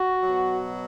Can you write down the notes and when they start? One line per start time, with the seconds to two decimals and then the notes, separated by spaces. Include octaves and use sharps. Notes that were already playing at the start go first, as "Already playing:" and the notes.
Already playing: F#4
0.23 B2 F#3